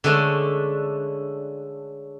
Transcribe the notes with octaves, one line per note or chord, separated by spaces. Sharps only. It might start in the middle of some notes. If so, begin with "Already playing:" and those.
D3 G#3 A3 C#4 D4